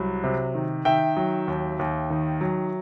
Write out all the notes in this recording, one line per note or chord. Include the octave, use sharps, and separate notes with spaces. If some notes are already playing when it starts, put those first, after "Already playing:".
Already playing: C2 F#3
C3
D#3
D#3 E5 G5
F#3
D#2
D#2
D#3
F#3